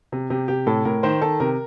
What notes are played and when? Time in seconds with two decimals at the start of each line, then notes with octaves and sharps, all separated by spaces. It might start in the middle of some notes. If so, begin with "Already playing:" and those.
0.12 C3
0.30 C3 G4
0.48 C3 G4
0.67 A2 A4
0.85 A2 A#4
1.03 D#3 C5
1.22 D#3 A4
1.40 C3 A#4